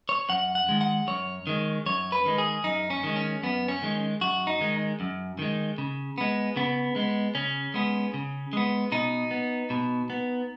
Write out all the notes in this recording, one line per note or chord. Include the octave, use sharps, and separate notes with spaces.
C#5
F#2 F#5
F#5
D#3 G#3
F#5
F#2 C#5
D#3 G#3
F#2 C#5
B4
D#3 G#3
G#4
F#2 D#4
C#4
D#3 G#3
C#4
F#2 B3
C#4
D#3 G#3
F#2 F#4
D#4
D#3 G#3
F#2
D#3 G#3
C#3
G#3 B3
C#3 B3
G#3 B3
C#3 C#4
G#3 B3
C#3
G#3 B3
B2 D#4
B3
B2
B3